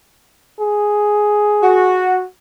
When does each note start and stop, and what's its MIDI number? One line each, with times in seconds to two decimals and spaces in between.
0.59 2.10 68
1.62 2.25 66